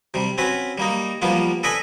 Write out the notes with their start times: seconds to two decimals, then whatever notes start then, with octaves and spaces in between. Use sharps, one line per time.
0.14 C3 G3
0.38 C4 C#4 F#4 B4
0.78 G3 A#3 D#4
1.22 F3 G3 A#3 B3 F4
1.63 A4 B4 D5 D#5 G#5 B5